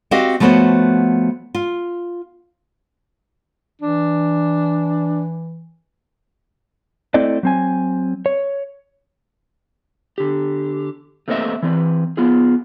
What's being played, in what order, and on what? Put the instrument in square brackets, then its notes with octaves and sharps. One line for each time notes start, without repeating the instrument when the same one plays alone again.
[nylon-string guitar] C4 F#4 G4 D#5 F5
F3 A3 B3 F#4 C5 C#5
F4
[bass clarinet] E3 [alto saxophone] D4
[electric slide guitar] A3 C4 E4 D5 D#5
F#3 C4 G#5
C#5
D3 G4
A3 A#3 C4 B4 D#5 E5
E3 C4 B4
B3 F4 G#4